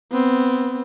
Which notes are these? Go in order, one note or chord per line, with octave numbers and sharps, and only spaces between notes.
B3 C4